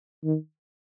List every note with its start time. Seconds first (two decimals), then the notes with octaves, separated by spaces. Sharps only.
0.24 D#3